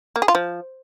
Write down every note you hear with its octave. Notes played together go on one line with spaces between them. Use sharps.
A#3
G#4
F4
F3